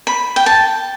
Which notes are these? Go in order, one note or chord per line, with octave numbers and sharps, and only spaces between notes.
B5
G5
A5